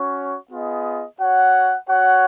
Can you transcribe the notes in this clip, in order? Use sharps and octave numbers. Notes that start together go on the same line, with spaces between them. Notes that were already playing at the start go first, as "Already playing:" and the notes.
Already playing: C#4 F#4 C#5
B3 F4 G#4 D#5
F#4 C#5 F#5
F#4 C#5 F#5